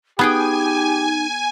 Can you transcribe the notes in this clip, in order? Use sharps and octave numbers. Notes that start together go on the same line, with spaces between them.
B3 D#4 G4 G#4 G5 G#5